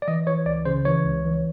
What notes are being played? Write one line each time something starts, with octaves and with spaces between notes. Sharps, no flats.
D5
E3 D#5
E3 C#5
C#2 D5
C#3 C5
E3 C#5
C#2
E3